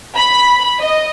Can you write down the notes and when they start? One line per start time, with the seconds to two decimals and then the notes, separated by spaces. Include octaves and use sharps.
0.16 B5
0.80 D#5